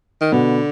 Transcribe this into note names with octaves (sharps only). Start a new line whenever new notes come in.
D#3
B2 D3 B3